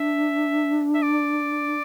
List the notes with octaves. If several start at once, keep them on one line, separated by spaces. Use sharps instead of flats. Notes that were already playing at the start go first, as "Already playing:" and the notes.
Already playing: D4 E5
E5
D5